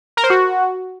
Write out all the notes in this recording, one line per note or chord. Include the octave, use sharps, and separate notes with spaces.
A#4
C5
F#4